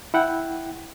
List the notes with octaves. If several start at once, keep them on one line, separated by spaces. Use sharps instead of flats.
E4 F#5 G5